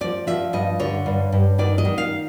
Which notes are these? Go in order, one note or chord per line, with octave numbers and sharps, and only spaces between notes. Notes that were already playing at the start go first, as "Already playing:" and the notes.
F3 D5
F3 E5
G2 D#5
D3 C#5
G2
G2
D#3 D5
D#5
D#3
F5